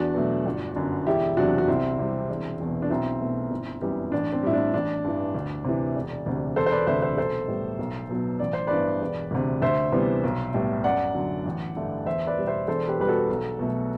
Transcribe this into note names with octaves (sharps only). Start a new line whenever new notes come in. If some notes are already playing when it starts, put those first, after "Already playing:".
Already playing: E2 D4 F#4
B2 F#3 A3
G1
F#2 D3
E1 E4 G4
E2 C3 F#3 D4 F#4
F#4
C2 C4 E4
C3 G3
E1
E2 B2
D4
B1 C4 E4
B2 A3
G1
F#2 E3 G3 B3
A1 D4
C4
A2 G3 E4
D4
A1 D4
G2 E3
D2
C3 E3
E1
D2 C3
E1 A4 C5
C5
B4 D5
D2 C3 C5 E5
C5 E5
B1 A4 C5
A2 G3 B3
B1
B2 F#3 B3
A1 D5
C5
G2 E3 B3 B4 D5
E1
D2 C3
D2 C5 E5
C3 E3 G3 B3
B1
A2 G3 B3
F#2 D5 F#5
D3 F#3
A1
G2 D3 A3
E2 C5 E5
B4 D5
B2 G3 B3
C5 E5
E1 A4 C5
G4 B4
E2 B2 G3 B3 B4
F#4 A4
B1
B2 F#3 A3